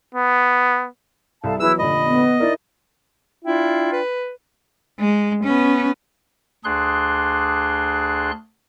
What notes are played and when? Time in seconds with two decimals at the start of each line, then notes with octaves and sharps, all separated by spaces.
0.15 B3
1.44 C2 A4 F5 A5
1.60 E3 F#3 B3 E4 G#4 B4 E6
1.79 F1 A#2 D3 D#5 B5
2.05 B3
2.40 D#4 E4 A#4 D5
3.45 D4 E4 F4 G5
3.92 B4
5.00 G#3
5.44 B3 C#4
6.64 D2 D4 G#4 C6 F#6